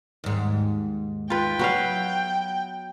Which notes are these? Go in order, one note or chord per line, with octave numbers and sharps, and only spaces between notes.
D#2 G#2
F4 B4 G5
F#3 B3 F#4 B4 F5